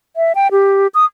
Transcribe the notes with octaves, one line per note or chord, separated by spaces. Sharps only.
E5
G5
G4
D#6